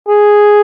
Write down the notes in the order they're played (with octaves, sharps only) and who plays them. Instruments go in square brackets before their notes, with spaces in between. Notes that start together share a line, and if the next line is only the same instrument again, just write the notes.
[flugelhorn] G#4